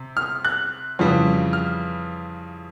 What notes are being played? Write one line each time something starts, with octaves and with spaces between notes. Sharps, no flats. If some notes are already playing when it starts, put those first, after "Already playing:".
Already playing: C3
F6
F#6
F2 C#3 E3 G3
F6